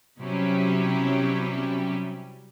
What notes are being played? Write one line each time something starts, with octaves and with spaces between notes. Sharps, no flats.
C3 F#3 G3 C#4 E4 G4